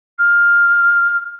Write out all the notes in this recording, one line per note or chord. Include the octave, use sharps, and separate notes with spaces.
F6